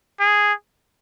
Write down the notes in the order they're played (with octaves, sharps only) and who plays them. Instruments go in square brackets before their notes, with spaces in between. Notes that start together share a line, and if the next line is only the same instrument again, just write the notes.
[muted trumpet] G#4